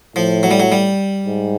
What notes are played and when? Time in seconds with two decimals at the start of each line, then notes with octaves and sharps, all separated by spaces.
0.16 A2 F3
0.43 F#3
0.51 G3
0.60 F#3
0.72 G3
1.26 G#2